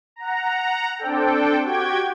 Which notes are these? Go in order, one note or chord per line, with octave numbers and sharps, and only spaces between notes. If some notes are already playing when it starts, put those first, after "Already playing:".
F#5 A#5
C4 D4 A4 G5
F#4 G4 G5 G#6